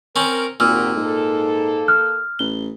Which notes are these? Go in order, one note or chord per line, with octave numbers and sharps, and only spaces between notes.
C4 C#4 A#4
G#1 A#2 F#4 G4 A#4 E6 F6
G#2 A#3 A4
D#6 F6 F#6
A1 G7